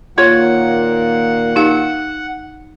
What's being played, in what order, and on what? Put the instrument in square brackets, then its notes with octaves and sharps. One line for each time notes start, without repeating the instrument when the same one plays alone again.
[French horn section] A#2 D#3 A#3 [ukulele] F4 C#5 [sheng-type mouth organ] F#5
[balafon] D#4 G4 F5